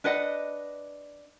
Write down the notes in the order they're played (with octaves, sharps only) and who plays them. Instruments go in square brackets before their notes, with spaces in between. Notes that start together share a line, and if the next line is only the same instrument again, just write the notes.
[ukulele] D4 B4 D#5 F#5